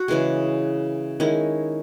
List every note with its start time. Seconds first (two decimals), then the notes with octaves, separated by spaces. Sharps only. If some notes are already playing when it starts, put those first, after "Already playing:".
Already playing: F#4
0.08 C#3 E3 G#3 G#4
1.20 D#3 G#3 C#4 E4